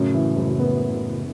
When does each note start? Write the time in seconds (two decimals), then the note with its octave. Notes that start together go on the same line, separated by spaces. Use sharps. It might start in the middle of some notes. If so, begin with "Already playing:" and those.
Already playing: F#2 A2 C#3
0.14 E3
0.36 F#1
0.59 B3